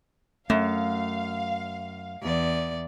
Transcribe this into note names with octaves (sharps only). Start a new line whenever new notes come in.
F#2 A3 F5
E2 D5